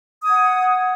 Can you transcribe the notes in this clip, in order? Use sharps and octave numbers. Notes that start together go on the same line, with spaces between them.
F#5 D#6 G#6